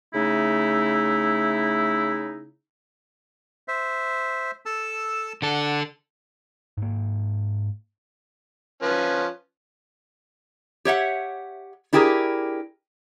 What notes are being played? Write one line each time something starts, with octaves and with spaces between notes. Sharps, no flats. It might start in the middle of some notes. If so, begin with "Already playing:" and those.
C#3 A3 D#4 E4
C5 E5
A4 A5 E6
D3 A4 D5 F#5
G#2 A#3
F3 C#4 B4
G4 C#5 E5 F#5
D4 E4 G4 G#4 A#4